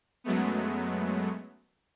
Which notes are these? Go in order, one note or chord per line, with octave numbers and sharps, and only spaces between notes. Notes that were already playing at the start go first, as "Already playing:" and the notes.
F#2 F#3 G#3 A3 B3